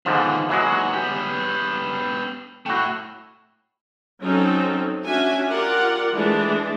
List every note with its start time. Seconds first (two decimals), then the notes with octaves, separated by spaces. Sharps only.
0.06 G#2 D3 D#3 F3 B3
0.49 D#2 E3 F#3 G#3 F#4
0.93 B3 G4
2.66 A3 E4 F#4 G5
4.22 F#3 C4 C#4 D#4 A4
5.05 C#4 D4 F#4 E5 G#5
5.49 F4 G4 A#4 D5 F#5
6.12 E3 G#3 A3 D4